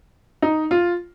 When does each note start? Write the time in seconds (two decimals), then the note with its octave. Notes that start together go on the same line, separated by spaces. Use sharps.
0.42 D#4
0.71 F4